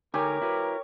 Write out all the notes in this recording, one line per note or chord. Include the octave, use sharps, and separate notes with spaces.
D2 D#4 G4 A#4 C#5 G#5
E4 F#4 B4